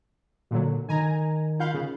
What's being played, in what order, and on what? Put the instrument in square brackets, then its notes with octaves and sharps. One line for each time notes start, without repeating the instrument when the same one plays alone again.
[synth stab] A#2 D3 F#3
[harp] D#3 [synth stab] G#5 A#5
[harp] F4 F#5 B5 [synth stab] F5 G6
[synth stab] C#3